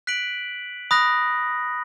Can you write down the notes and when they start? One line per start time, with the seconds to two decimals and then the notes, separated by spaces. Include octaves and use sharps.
0.07 F#6 B6 D7 F#7
0.91 B5 D#6 F#6 A#6